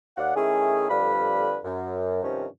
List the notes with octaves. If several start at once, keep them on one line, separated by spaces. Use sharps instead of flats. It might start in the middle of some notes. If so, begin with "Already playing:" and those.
D#2 D5 F5 F#5
D#3 A3 C#4 E4 G#4
F2 D3 G3 B4 F5 B5
F#2
G2 C3 D#3 F3 C#4